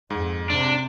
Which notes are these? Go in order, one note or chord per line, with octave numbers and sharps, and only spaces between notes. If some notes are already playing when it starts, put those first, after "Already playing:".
F2 G#2
C3 D4